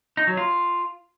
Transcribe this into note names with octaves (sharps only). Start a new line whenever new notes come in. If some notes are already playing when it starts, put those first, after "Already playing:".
D#4
F#3
F4